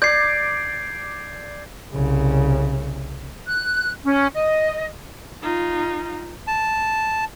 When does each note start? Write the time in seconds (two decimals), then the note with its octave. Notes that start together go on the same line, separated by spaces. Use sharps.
0.02 D5 G6 G#6 C7
1.93 C2 C#3
3.47 F#6
4.04 C#4
4.34 D#5
5.42 D#4 F4
6.47 A5